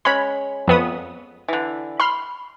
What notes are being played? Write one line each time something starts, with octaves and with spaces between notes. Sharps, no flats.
G#3 C#4 B5
F2 B3 D#6
D3 E3
B5 C6 F6